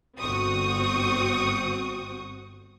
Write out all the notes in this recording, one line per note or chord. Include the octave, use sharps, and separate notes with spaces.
G1 C4 F#4 C#6 D#6